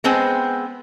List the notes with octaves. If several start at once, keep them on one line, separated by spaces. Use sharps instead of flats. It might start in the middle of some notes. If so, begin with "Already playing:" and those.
G#3 B3 C4 C5 G#5